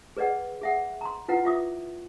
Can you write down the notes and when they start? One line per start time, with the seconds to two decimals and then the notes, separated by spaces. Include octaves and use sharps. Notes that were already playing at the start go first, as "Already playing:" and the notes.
0.17 G#4 B4 D5 D#5 F#5
0.61 G#4 E5 F#5
1.01 A#5 C6
1.28 E4 F4 B4 F#5
1.45 F4 E5 D6 D#6